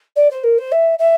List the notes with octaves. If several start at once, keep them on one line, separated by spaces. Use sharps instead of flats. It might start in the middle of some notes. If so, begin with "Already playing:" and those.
D5
C5
A#4
C5
E5
E5